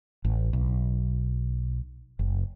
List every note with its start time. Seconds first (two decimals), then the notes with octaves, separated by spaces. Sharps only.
0.25 A1
0.53 B1
2.19 F#1